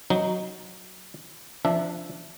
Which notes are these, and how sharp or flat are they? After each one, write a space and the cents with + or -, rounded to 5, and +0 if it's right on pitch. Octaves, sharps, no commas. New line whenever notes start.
F#3 +0 D#4 +0
F3 -15 D4 +0 E5 +0